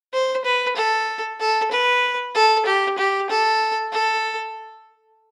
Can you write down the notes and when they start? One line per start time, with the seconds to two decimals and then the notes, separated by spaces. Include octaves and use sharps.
0.13 C5
0.45 B4
0.76 A4
1.40 A4
1.71 B4
2.35 A4
2.66 G4
2.98 G4
3.30 A4
3.92 A4